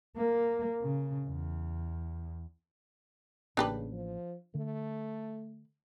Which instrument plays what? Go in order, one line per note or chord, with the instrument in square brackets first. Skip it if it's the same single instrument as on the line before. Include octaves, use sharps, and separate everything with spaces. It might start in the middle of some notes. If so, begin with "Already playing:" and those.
[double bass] A#3
C#3
E2
[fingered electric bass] A1 A#3 [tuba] C#3 [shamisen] D4 G4 B4
[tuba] F3
[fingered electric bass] D3 [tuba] A3